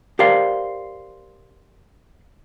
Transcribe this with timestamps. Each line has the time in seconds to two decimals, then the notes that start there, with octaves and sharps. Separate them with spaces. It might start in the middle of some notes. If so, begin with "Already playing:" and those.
0.19 G4 A#4 C5 D5 F5